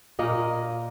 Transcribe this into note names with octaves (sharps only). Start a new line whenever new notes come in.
A#2 A#3 D#5